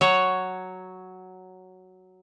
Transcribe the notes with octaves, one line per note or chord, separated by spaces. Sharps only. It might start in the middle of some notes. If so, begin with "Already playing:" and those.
F#3 C#5